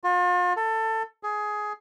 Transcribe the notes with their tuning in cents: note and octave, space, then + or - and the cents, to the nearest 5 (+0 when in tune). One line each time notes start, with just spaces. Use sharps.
F4 +40
A4 +20
G#4 +15